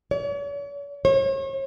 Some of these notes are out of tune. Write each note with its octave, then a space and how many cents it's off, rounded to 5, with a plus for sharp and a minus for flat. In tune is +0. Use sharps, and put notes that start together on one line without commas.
C#5 +45
C#5 -40